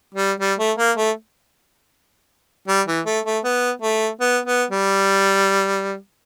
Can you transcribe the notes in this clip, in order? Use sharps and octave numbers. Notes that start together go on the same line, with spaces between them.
G3
G3
A3
A#3
A3
G3
E3
A3
A3
B3
A3
B3
B3
G3